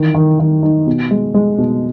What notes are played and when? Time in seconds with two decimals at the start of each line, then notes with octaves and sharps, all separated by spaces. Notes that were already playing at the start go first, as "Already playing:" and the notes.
Already playing: D#3 E3
0.14 D#3
0.39 D#3
0.63 D#4
0.87 B2
1.11 G#3
1.34 G#3
1.58 B2